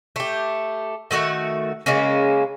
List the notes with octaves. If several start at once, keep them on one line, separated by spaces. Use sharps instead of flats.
A3 G4
D#3 A3 F#4 F#5
C#3 G#3 A#3 C#4